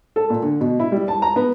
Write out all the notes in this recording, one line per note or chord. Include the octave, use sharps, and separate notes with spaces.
A4
A#2
D3
B2
E4
G3
A5
A#5
B3